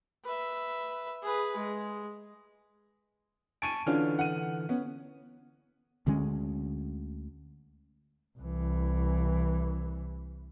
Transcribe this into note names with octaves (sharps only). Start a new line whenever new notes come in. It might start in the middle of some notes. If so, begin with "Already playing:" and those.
B4 E5
G#4 B4
G#3
G#5 A5 C#6 D7 D#7
D3 E3 C#4 D4 F4 F6
F#5 D#7
B3 C#4
D2 D3 G#3 C#4
C2 E3